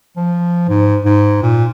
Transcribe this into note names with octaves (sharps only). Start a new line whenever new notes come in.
F3
G#2
G#2
A#2